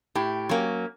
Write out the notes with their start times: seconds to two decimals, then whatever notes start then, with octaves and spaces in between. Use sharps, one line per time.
0.15 A2 G4
0.49 F#3 A#3 C#4